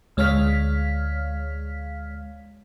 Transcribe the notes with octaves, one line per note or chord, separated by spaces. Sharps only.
D2 G#3 C#5 F5 F6 B6